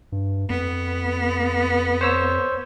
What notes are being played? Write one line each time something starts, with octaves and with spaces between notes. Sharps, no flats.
G2
F2 B3
C5 C#5 E6